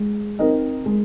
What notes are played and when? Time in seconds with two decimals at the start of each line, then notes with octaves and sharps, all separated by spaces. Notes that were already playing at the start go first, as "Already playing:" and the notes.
Already playing: G#3
0.39 C4 D#4 A#4 D#5
0.86 G#3